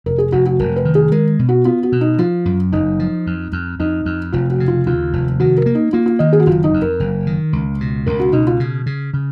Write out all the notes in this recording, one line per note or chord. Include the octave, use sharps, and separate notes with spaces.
F1 A#4
G#4
F1 F#4
F#4
F1 A#4
B4
D#3
G#4
G#3 A#4
B2
F#4
B3 F4
F#4
B2
D#4
F3 F4
F#2
F#1 D#4
F3
F2
F2
F2 D#4
F2
F1 F4
F#4
C#3
F4
D#2 F4
F1
D#3 F#4
A#4
A#3
D#4
A#3 F4
F4
D#3 D#5
G#4
F#4
F#1 F4
D#4
F2
A#4
F#1
D#3
C#2
B2
C#2 A#4
F#4
B2 D#4
F4
C#3
C#3
C#3